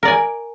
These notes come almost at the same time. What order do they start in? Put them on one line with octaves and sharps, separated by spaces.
A#4 D5 G#5